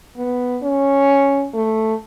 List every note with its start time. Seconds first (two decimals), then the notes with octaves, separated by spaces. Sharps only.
0.17 B3
0.63 C#4
1.53 A3